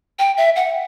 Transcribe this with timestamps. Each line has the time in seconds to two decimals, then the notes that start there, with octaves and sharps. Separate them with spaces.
0.19 G5
0.37 E5
0.56 F#5